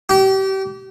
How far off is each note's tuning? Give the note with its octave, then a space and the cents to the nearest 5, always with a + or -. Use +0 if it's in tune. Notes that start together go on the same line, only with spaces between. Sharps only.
G4 -30